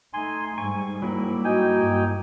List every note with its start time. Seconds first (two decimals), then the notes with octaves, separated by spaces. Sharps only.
0.13 A3 D#4 G#5 C6
0.58 G#2 G3 G#5 C#6
1.02 F#3 A#3 E4 B5
1.44 D#4 F#4 G5 G#5
1.74 G2